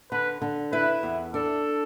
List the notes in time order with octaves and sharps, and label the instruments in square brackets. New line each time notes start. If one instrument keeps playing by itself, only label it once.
[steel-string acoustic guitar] D3 [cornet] B4
[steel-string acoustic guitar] D3
[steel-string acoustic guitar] E4 [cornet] B4
[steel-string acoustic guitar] E2
[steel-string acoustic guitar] D4 [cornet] A4